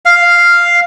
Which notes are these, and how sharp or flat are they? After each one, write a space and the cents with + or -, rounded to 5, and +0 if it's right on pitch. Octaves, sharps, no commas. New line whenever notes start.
F5 +0